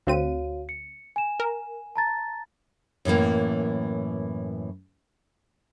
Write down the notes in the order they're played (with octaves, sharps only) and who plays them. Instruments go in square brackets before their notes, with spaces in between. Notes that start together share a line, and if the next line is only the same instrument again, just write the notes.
[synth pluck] D2 C4 D#7 [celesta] F#4 C#5 F5
[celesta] C#7
G#5 E7
[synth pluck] A#4
[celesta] A5 A#5 A6
[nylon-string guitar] F#2 A2 E3 A#3